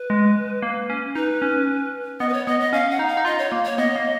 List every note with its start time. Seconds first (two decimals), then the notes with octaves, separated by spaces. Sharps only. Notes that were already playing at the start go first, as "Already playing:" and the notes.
Already playing: B4
0.10 G#3
0.62 A#3
0.90 C#4
1.15 D#4 B4
1.42 C#4
2.20 B3 D#5
2.29 B4
2.33 C#5
2.47 B3 D#5
2.60 D#5
2.73 C#4 F5
2.91 F#5
2.99 D#4
3.08 F5
3.17 D#4
3.25 F4 D#5
3.38 C#5
3.52 A#3
3.65 C#5
3.78 B3 D#5
3.96 A#3